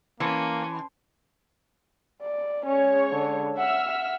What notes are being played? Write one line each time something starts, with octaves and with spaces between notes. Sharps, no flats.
E3 A#3 C#4 A5 C6 C7
D5
G#3 C#4 C#5
D3
E5 F#5 E6 F6
F#5